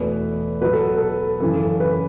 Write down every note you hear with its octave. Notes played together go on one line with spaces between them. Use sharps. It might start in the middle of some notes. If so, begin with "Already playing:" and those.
Already playing: E2 B2 A3 B4
B2 F#3 B3 B4
A4
A4
F#2 C#3 E3 A4
B4